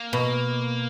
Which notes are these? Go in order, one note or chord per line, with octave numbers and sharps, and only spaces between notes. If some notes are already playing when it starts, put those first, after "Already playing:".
Already playing: A#3
B2